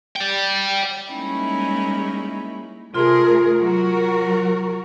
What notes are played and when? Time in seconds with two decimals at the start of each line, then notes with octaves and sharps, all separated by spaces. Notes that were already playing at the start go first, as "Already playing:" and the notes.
0.16 D5 G5
1.11 G3 G#3 A#3 C#4 D#4 E4
2.94 C3 A3 F4 G#4 A#4 C6
3.61 F#3 F#4 A#4